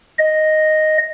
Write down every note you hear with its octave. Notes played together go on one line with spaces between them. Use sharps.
D#5